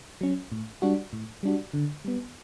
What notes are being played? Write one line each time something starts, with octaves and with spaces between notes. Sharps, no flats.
F#3 C#4
A2
G3 D4 F#4
A2
G3 D4 F#4
D3
G3 B3